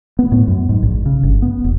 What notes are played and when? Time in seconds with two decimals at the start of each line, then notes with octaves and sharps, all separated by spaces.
0.19 B3
0.32 A2
0.47 F#2
0.69 G#2
0.83 A#1
1.06 C#3
1.23 G1
1.42 B3
1.64 E1